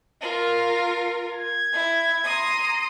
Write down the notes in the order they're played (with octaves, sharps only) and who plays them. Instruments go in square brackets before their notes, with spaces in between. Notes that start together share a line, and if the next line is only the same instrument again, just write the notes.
[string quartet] F4 A#4
[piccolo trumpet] G#6
[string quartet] E4
A#5 C6 D#6